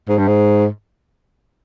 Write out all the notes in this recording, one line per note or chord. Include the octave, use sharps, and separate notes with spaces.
G#2
G2
G#2